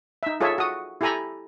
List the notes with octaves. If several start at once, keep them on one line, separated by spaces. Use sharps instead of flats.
D#4 E5
F4 G#4 A4 C#5 E5
F#4 D#6
E4 G4 A4 G#5 A#5 B5